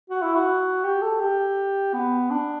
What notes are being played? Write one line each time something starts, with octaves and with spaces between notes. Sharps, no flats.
F#4
E4
F#4
G4
A4
G4
B3
D4